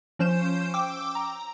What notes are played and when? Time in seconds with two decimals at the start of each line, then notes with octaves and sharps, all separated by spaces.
0.19 F3 C#4 C5 G6 E7
0.74 G5 D6 E6
1.15 A#5